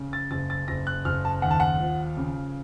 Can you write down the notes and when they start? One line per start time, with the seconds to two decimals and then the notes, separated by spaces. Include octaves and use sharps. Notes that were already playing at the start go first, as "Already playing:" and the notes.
Already playing: C#3
0.13 A6
0.31 F#1 A6
0.50 A6
0.68 F#1 A#6
0.87 F#6
1.05 F#1 F6
1.25 A5
1.42 D#2 F#5
1.51 A5
1.60 F#5
1.80 F3
2.17 C#3